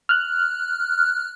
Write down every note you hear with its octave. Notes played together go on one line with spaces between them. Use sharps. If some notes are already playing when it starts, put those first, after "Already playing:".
F6 F#6